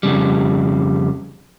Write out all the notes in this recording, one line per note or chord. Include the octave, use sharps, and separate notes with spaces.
F2 C#3 G3